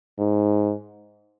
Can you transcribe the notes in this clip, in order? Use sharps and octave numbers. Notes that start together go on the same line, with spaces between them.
G#2